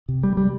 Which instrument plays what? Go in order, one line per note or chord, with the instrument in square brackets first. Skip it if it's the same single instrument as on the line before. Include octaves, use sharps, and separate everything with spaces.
[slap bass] C3
G3
G3